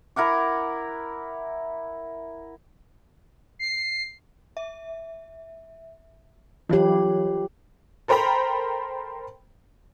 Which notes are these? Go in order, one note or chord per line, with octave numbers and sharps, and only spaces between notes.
E4 A#4 F#5 D6
C7
E5
E3 F#3 F4 G4 C#5
A4 A#4 C5 G5 A#5 B5